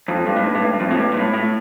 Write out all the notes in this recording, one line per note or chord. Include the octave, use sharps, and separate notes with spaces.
F2
G2
A2
G2
A2
G2
G2
F2
A2
G2
A#2
A2
A2